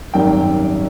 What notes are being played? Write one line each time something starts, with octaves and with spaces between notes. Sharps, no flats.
G#1 F#2 D#3 G3 G5